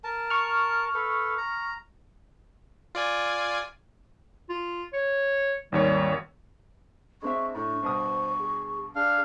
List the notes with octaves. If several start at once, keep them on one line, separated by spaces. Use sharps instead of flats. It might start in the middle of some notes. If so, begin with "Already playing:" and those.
A#4 A5
C#6 F6
A4 B4
A#5
F4 D5 G#5
F4
C#5
G#1 D#2 G3 C#5
G#3 C4 D4 E5 C#6
A2 C#6
G2 B2 C5 D#6
G#4
D4 G#4 F5 F6